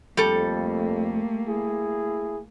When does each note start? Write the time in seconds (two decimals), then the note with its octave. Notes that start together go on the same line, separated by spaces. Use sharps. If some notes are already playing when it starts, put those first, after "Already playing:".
0.17 F2 G3 A3 A#3 A4
1.48 E4 G#4